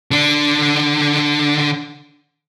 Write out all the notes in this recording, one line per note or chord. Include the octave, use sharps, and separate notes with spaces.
D3 D4